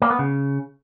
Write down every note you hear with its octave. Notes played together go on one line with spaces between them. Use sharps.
A#3
B3
C#3